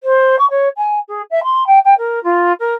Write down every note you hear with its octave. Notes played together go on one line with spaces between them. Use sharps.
C5
C#6
C#5
G#5
G#4
E5
C6
G5
G5
A#4
F4
A#4